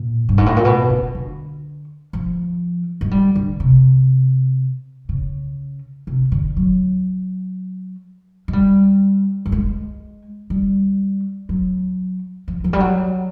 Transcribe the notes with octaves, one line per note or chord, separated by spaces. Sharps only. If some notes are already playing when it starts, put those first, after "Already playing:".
Already playing: A#2
G2
G#2
A2
A#2
B2
C#3
D3
F3
G#3
G3
D3
C3
C#3
C3
D3
F#3
G#3
G3
G3
G#3
G3
F#3
F3
F3
G3
F#3